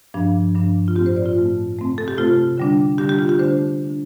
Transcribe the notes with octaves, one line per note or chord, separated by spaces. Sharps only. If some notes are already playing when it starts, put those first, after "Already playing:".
G2 F3 D4
G2 F3 D4
F4
A2 A3 C4 G4
C5
D5
F4
A2 A3 C4
C3 A3 C4
A4
G4
C3 A3 C4 F4
D3 G3 D4
D3 G3 D4 G4
G4
F4
G4
D3 A3 D4 C5
D3 A3 D4